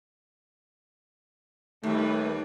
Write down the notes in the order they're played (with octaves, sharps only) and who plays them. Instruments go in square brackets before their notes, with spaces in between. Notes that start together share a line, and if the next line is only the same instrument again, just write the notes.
[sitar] D#2 [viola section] G3 A#3 B4 [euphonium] A3